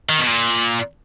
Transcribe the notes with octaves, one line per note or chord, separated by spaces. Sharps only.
D#3
B2
A#2